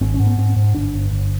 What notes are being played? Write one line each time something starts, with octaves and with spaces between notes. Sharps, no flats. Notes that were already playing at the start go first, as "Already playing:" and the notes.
G#1 C4
C#4
G#2
B3
G#2 C4
G#2
G1 D4
G1
G1